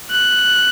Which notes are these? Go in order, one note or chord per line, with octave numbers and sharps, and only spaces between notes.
F#6